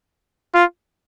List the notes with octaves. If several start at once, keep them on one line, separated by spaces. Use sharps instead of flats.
F4